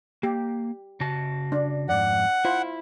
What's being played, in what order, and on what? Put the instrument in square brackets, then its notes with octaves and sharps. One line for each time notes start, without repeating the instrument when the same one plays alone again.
[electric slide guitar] A#3 [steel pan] G4
[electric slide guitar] C#3 F#4 A5
[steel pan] D4 D5
[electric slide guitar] F2 G#2 [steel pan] D5 [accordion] F#5
[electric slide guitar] E4 [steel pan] F4 C5